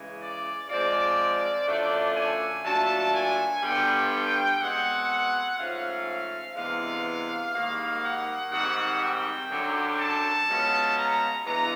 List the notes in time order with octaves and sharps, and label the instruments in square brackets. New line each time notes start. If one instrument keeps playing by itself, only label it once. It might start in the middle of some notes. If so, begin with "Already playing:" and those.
Already playing: [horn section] C#3 E3 G#3
D5
F3 G#3 C4 F4 D5
F#2 D3 F3 A3 D4
G#5
A#2 F#3 A3 D4 F4 A5
G#5
G2 D3 G3 B3 G5
B2 G#3 C4 F#5
G#2 F3 A3 C#4 F5
C3 E3 G#3 B3 D4 F5
G#2 D#3 G3 A#3 F5
F#5
G#2 D#3 G3 C4 F#5
G5
F#2 D3 F#3
A5
B2 G#3 C#4 F4
A#5
G2 E3 G#3 B3 D#4 A#5